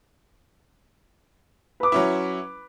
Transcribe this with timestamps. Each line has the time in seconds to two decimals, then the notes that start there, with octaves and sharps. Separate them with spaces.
1.80 B4 D6
1.92 F#3 C#4 E4